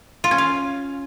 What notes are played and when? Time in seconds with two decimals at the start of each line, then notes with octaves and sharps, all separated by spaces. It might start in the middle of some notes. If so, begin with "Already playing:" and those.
0.24 F4
0.31 C#4
0.38 F5